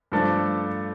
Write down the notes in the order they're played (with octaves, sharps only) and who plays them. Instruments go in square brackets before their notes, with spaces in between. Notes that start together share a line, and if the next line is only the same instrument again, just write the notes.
[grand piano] G2 F3 A3 D4 A4